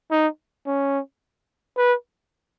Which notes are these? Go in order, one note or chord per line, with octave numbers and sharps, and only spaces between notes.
D#4
C#4
B4